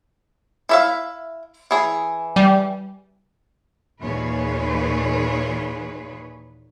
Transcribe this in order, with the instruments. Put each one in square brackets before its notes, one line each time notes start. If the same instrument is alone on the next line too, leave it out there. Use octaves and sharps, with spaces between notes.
[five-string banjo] E4 E5 F5
E3 G#4
[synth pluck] G3
[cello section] D#2 A#2 E3 G#4 B4 C#5